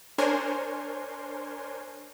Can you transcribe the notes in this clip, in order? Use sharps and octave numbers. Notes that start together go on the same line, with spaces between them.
D4 A#4 C5 C#5 G#5 C6